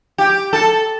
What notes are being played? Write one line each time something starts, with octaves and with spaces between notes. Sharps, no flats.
G4
A4